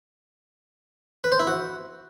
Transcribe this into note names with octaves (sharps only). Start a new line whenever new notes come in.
B4
C5
E4
F#4